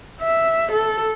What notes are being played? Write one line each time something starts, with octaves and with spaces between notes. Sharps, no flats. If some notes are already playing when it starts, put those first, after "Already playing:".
E5
A4